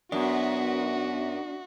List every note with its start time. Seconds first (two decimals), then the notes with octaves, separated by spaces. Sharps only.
0.12 F#2 B3 D4 F#4